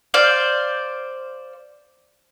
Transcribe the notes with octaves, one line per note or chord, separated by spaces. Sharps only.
C5 D5 F5